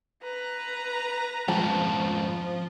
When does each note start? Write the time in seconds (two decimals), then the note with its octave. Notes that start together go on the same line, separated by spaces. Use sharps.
0.23 B4 A#5
1.48 F2 G#2 F3 A5